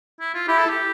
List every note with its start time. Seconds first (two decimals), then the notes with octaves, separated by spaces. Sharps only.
0.20 E4
0.34 F4
0.48 E4 G4
0.59 A4
0.69 G4